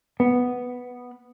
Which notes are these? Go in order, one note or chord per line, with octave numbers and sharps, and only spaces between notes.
B3